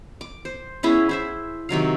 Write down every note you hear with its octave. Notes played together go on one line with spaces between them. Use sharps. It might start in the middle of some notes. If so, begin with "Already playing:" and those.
D6
C5
B3 C#4 E4 G#4
E4 C5 E5
C3 D#3 F#3 F5